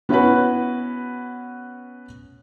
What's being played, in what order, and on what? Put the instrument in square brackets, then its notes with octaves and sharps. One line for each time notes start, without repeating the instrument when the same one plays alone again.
[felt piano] B3 C#4 E4 F#4 B4